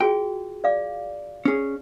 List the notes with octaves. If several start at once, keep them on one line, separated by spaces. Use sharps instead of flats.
F4 F#4 G#4 G5
D5 F5 D6
C#4 G#4